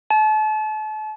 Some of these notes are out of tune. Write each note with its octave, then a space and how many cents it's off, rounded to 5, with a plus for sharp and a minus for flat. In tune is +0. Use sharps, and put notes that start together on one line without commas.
A5 -35